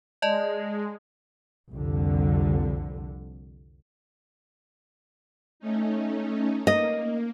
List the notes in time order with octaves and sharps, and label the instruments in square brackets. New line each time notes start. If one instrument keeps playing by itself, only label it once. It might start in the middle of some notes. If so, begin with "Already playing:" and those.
[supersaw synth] G#3 [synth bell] D5 D#5 A5
[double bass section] C2 F2 D3
[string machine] A3 C#4 D#4
[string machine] A#3 [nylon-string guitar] D#5